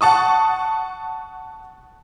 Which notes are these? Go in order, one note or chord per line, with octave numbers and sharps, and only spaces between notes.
F#5 A5 C#6 D#6